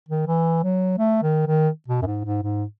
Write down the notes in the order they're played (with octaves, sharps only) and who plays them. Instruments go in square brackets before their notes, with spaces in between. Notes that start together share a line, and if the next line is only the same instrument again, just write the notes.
[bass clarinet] D#3
E3
F#3
A3
D#3
D#3
B2
F#2
G#2
G#2
G#2